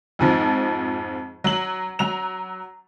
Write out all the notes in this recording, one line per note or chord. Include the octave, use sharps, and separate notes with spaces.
F2 G#2 F3
F#3 F#7
F#3 A#5 F7